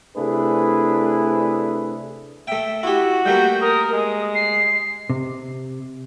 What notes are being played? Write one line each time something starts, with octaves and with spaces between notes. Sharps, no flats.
C3 A3 D4 E4 G#4 B4
A3 E5 G5
E4 F#4 G4
G3 A3 A#3 G6
A#4 D#6
G#3 D#6
C7
C3